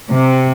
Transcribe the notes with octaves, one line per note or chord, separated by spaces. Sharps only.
C3